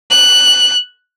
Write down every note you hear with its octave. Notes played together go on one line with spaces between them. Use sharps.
F#6